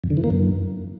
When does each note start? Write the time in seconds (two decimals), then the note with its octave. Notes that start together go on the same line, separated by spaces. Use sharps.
0.04 F2
0.10 D3
0.17 E3
0.24 A#3
0.30 F#2